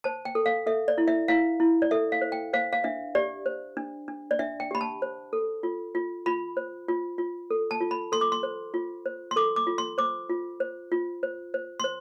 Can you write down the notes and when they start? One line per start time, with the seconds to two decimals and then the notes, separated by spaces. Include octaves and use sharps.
0.04 C5 A5
0.25 G5
0.35 A4
0.46 F5
0.66 A4 E5
0.88 D5
0.98 E4
1.08 E5
1.28 E4 F5
1.60 E4
1.82 D5
1.91 A4 E5
2.12 F5
2.21 C5
2.32 G5
2.53 C5 F5
2.73 F5
2.84 D4 E5
3.15 G4 D5
3.46 C5
3.77 D4
4.08 D4
4.31 D5
4.39 D4 E5
4.60 G5
4.71 G4 B5
4.81 A5
5.02 C5
5.33 A4
5.63 F4
5.95 F4
6.26 F4 B5
6.57 C5
6.88 F4
7.18 F4
7.51 A4
7.71 A5
7.81 F4
7.91 B5
8.12 A4 C6
8.21 D6
8.32 C6
8.43 C5
8.74 F4
9.06 C5
9.31 C6
9.36 A4 D6
9.56 D6
9.67 F4
9.78 C6
9.98 C5 D6
10.29 F4
10.60 C5
10.92 F4
11.23 C5
11.54 C5
11.80 C6
11.84 C5